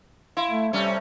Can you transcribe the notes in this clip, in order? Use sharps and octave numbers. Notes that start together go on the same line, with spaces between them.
E4 F5 C6
A3
C3 G3 A3 C#4